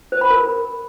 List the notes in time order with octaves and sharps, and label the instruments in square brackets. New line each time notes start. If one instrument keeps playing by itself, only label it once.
[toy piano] C5
B5
A#4